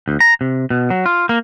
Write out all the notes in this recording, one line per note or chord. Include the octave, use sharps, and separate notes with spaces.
D2
A#5
C3
B2
F#3
F4
A#3